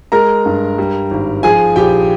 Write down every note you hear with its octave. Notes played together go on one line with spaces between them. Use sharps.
G#3 A#4 A#5
G2
G3
G#1
F3 G#4 G#5
A#1 G4 G5